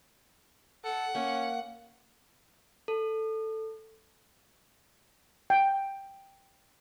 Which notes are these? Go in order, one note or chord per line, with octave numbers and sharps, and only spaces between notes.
A4 F#5
A#3 C#4
A4
G5